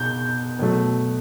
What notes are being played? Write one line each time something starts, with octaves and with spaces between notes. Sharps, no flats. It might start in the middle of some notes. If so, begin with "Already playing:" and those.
Already playing: B2 G6
B2 F#3 A3